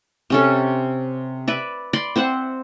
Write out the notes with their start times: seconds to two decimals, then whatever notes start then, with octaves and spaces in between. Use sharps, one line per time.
0.30 C3 C#4 A4
1.48 B4 D5 E5
1.93 D5 B5 C6
2.16 C4 C5 E5 F#5